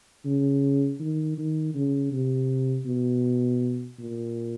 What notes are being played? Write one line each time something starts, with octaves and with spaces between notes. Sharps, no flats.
C#3
D#3
D#3
C#3
C3
B2
A#2